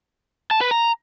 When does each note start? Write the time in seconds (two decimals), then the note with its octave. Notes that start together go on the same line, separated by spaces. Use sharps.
0.51 A5
0.61 B4
0.71 A#5